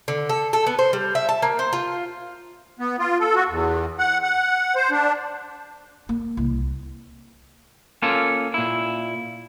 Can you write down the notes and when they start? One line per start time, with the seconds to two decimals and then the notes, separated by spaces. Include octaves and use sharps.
0.08 D3
0.29 A4
0.53 A4
0.67 B3
0.79 C5
0.93 G3
1.15 E5
1.29 A5
1.42 A#3
1.59 C5
1.73 F4
2.80 B3
2.99 F4
3.20 A4
3.35 F#4
3.49 E2
3.99 F#5
4.23 F#5
4.76 C5
4.91 D4
6.09 A#3
6.37 C2
8.02 A#3 C#4 F4 A4
8.54 A#2 E4